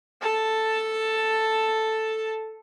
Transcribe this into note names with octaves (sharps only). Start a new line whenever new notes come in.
A4 A5